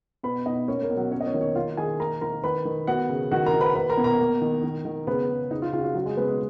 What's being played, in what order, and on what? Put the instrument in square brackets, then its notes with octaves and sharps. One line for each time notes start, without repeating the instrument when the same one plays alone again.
[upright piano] B2 B4 B5
B2 D#4 D#5
A#3 C#4 C#5
A#3 A#4
B2
F#3 F#4
A#3 C#4 C#5
D#5
C#4 C#5
D#3
C#4 C#5
A#3 F4 F5
D#3 G#4 G#5
A#3 A#4 A#5
D#3 A#4 A#5
D#3 B4 B5
D#3
B3 F#4 F#5
C#3
D#3 F#4 F#5
A#4 A#5
D#3
B4 B5
A#3 B4 B5
A#4 A#5
B2
A#4 A#5
A#3
D#3
D#3
D#3
C#3 B3 B4
C#3
C#3 D#4
F4
C#3 F4
F#4
F4
C#3 F#3 F#4
G#3 G#4
C#3 B3 B4
G#3 G#4